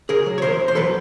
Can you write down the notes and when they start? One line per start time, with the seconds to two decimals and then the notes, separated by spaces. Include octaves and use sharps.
0.09 C#3 G#4 A#4
0.26 F#3
0.38 C#5
0.42 E2 A#4 C5
0.60 E2
0.68 C5
0.75 F#3 A4 B4